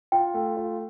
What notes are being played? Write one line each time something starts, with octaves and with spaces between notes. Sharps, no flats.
F4 G5
A3
F4